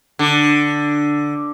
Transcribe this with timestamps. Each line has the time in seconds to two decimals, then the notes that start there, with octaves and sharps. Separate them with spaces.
0.19 D3